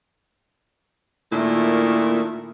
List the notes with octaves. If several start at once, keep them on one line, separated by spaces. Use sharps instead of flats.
A#2 D#3 A3 D4 E4